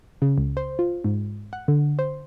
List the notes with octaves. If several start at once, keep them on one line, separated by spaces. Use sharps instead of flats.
C#3
C#2
C5
F4
G#2
F#5
D3
C5